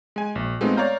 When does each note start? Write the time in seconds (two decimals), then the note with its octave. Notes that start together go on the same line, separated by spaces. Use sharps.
0.16 G#3 G#5
0.35 A#1
0.61 G#3 A3 B3 C4 D#4 F4
0.77 C#5 D5 F5 A#5 F6 G6